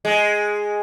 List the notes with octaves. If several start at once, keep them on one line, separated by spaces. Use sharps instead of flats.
G#3